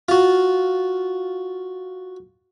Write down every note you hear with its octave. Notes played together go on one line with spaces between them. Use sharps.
F4 F#4